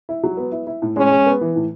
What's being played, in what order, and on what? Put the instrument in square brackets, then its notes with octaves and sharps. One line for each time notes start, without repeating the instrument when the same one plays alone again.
[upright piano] E4
F#3
B3
E4
E4
A2
[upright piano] G#3 [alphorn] C#4
[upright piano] G#3
B3
E3
A2